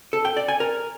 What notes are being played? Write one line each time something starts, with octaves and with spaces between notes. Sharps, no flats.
A4
G5
D5
G#5
A#4